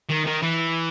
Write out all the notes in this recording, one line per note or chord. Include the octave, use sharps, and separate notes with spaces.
D#3
D#3
E3